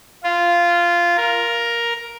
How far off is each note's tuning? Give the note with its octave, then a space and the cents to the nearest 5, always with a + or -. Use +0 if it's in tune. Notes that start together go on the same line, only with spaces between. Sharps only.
F4 -10
A#4 +10